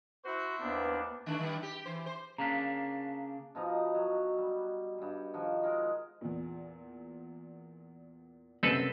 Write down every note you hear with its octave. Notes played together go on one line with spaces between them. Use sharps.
E4 F#4 C5
D#2 B3 D4
D#3 A3 D4
D#3 G3
G4
E3 C5
C5
C#3 A#3 D4 A#5 B6
B2 F3 D#4 A#5
F#3
G3
G2 G3
D#3 F3 F#4
G#3 A#4 D#5
E2 A#2
F#2 C3 C4 A4 B4